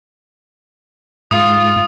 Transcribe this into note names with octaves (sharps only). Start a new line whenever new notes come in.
G#2 F4 D#6